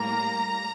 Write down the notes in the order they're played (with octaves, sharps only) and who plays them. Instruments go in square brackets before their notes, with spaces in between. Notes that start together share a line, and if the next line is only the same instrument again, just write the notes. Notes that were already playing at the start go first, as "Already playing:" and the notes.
Already playing: [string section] A2 G3 A#3 A#5